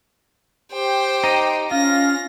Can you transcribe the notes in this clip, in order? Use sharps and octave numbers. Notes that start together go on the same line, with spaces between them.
G4 C5 G5
D#4 D#5
C#4 F4 F5 A#6